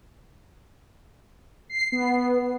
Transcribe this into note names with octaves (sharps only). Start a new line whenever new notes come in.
C7
B3